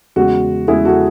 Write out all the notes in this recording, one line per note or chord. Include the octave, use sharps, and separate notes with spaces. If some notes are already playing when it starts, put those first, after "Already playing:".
E2 C#3 G#3 F#4
E2 C#3 G#3 E4 G#4
F#4 A4